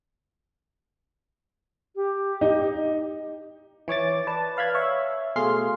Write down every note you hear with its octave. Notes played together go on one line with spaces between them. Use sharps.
G4
D#4
E3 C#5 D6 A6
B4 D5 A5
B4 F5 B5 G#6
C#5 E5
B2 A3 G#4 F5 C6 C7